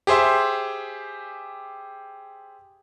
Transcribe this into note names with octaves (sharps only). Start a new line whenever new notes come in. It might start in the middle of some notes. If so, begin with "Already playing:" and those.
G4 G#4 C5 E5 C6